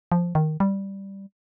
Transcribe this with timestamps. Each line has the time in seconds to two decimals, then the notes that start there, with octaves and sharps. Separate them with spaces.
0.12 F3
0.35 D#3
0.60 G3